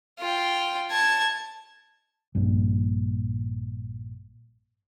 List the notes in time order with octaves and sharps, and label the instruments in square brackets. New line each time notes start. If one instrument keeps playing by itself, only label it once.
[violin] F4 G5
A5 G#6
[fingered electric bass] A#1 G2 A#2